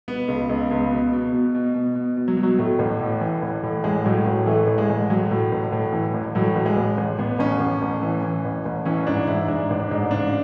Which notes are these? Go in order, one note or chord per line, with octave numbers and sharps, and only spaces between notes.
B2 B3
C#2
C#2
C#2 B3
B2
B2
B2
B2
B2
B2
B2
F#3
B2
F#3
A2 A3
A1
A2
E3
A1
A2
A1 G#3
A2 F#3
A1 G#3
E3 A3
A1
G#3
A1
A2 F#3
A2
A1
A2
E3
A1
A2 F#3
A1
G#3
A1
A1
A1 B3
A1 C#4
A1
A1
E3
E3
A1
A1
E3 C#4
G#2 D4
G#2 E4
G#2 D4
A1
D4
G#2
C#3 D4